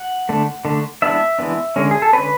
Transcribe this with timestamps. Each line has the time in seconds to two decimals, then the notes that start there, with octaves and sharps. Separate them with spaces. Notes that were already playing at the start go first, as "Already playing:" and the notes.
Already playing: F#5
0.29 D3 A3 D4
0.65 D3 A3 D4
1.02 E3 G#3 B3 D4 E5
1.39 E3 G#3 B3 D4
1.76 D3 G#3 C#4
1.91 G#4
2.02 A4
2.13 D3 G#3 C#4 B4